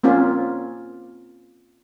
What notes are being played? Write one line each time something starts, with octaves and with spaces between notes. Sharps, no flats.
A#3 C4 C#4 F4